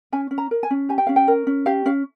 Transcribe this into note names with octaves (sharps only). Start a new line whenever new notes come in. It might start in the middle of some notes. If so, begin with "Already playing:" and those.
C#4 G#5
C#4
A#5
A#4
G#5
C#4
G4 G#5
G5
C#4 F5
G5
A#4
C#4
G4 F5
C#4 F5